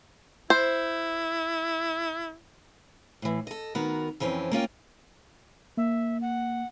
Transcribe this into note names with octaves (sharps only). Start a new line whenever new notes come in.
E4 C5
A2 E3
A4 D#5
D#3 B3 F#4 A#4
F2 E3 C4 C#4
A#3 C#4 F4 G5
A#3 E5
F#5